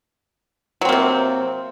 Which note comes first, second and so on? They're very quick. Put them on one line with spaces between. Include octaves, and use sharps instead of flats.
F#3 C4 A#3 C3